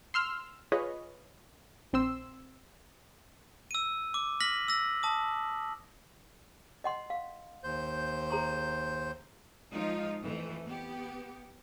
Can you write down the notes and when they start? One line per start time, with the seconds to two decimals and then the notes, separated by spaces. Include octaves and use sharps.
0.14 C6 E6 F6
0.72 F4 G#4 B4 C#5 D#5
1.93 A#1 C4 C6 E6
3.71 E6 D#7
4.14 D6
4.40 F6 A#6 B6 F#7
4.68 E6 A#6
5.03 A5 D#6
6.84 D#5 F#5 C6
7.10 F5
7.64 D#2 C5 G6
8.30 G#4 A#5 C6
9.73 F3 G#3 D#4 F4
10.24 F2 E3 A3
10.67 B3 G4